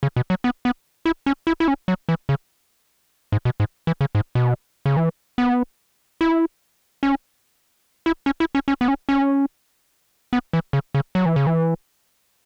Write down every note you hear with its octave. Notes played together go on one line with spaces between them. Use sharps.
C#3
B2
F#3
B3
B3
E4
C#4
E4
E4
C#4
F#3
E3
C#3
G#2
B2
G#2
E3
C#3
G#2
B2
C#3
E3
B3
E4
C#4
E4
C#4
E4
C#4
C#4
B3
C#4
C#4
B3
E3
C#3
C#3
F#3
E3
C#3
E3